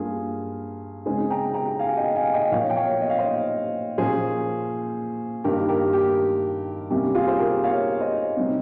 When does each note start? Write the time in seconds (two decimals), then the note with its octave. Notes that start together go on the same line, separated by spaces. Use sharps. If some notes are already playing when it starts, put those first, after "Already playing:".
Already playing: G2 G3 A#3 C#4 F4 G#4
1.06 C#3 G#3 C4 G#4 C5
1.30 G5 A#5
1.54 G5 A#5
1.79 F5 G#5
1.97 D#5 G5
2.16 F5 G#5
2.34 D#5 G5
2.52 A#2 F3 A#3 C#5 F5
2.70 G5
2.76 C#5 F5
3.01 D#5
3.10 F5
3.19 C5 D#5
3.98 A#2 F3 A#3 C#4 G#4 C5
5.44 G2 D#3 A#3 G4 A#4
5.69 G4 A#4
5.93 G4
6.90 C3 G3 A#3 C#4 G4
7.15 F4 G#4
7.28 C5
7.39 G4 A#4
7.64 C#5 F5
8.00 C5 D#5
8.37 C3 G3 C4